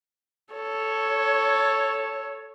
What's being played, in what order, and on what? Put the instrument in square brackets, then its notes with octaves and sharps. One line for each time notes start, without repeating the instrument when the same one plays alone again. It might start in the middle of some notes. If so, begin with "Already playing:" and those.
[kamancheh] A4 C#5